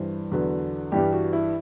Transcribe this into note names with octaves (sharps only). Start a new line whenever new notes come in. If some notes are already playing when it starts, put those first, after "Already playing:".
Already playing: G2 E3 G3 C5
E2 D3 F#3 B4
G2 E3 G3 G4
F#4
E4